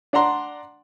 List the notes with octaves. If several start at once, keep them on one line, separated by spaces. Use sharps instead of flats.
D4 D5 F#5 A#5 C6